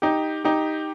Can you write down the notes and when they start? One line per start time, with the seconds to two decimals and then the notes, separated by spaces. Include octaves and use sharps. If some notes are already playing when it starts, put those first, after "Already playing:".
0.02 D#4 G4
0.44 D#4 G4